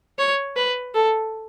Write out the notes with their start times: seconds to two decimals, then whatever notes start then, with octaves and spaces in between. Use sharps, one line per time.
0.19 C#5
0.56 B4
0.94 A4